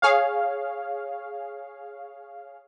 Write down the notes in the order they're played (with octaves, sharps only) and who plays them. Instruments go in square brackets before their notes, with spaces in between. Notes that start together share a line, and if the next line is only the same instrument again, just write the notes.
[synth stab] G#4 C#5 F5